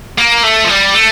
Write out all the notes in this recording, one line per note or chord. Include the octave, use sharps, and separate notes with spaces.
A#3
A3
F3
G3
A3